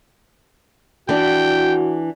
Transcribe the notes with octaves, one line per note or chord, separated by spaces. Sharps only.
E3 D4 F#4 G5